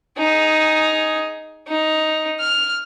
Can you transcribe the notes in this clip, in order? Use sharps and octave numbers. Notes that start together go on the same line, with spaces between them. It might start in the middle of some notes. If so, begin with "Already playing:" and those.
D#4 G#4
D#4
F6